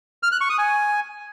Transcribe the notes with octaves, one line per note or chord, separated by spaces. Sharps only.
F6
F#6
C#6
D#6
G#5